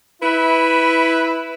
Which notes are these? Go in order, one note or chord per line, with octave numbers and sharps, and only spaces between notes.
E4 B4